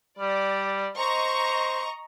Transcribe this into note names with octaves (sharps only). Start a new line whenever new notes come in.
G3 D5
C5 D#5 A#5 C#6